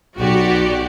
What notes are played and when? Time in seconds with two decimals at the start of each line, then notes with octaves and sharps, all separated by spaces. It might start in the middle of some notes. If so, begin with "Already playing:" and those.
0.18 B1 F#4 G4 D5